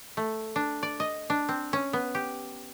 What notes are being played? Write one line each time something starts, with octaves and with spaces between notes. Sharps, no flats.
A3
D4
D5
D#5
D4
C4
C#4
B3
G4